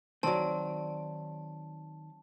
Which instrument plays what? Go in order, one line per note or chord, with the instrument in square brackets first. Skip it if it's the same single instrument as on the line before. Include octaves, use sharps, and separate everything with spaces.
[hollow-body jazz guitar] D#3 D5 [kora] F#3 C4 [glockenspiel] A5